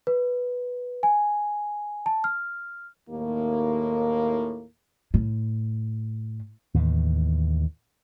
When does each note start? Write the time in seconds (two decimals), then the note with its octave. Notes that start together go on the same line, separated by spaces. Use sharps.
0.07 B4
1.03 G#5
2.06 A5
2.24 F6
3.09 D#2 A2 A#3
5.14 A2
6.74 D#2 A2 E3